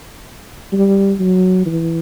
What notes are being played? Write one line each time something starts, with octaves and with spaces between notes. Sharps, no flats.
G3
F#3
E3